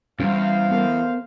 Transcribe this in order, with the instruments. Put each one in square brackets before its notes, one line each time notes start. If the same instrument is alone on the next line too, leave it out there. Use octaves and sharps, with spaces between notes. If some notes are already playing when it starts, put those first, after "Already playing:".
[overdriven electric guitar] E2 [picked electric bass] G3 C#4 [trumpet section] C5 F5
[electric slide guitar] B3 A4 A#4